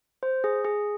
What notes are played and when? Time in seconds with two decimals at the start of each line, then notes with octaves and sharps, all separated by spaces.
0.23 C5
0.44 G#4
0.65 G#4